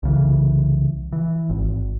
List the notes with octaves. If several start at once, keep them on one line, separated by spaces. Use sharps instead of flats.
C2 C#3 E3
E3
G#1